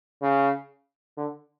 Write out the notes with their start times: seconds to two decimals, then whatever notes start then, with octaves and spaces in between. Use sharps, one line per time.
0.22 C#3
1.17 D3